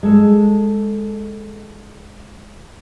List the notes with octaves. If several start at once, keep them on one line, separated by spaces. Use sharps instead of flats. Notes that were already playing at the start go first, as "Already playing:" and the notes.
G#3 A4